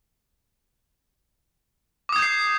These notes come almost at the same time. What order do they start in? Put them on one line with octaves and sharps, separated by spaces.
D6 D#6 G#6 G6 C7